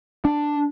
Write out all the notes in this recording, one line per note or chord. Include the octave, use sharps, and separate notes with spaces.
D4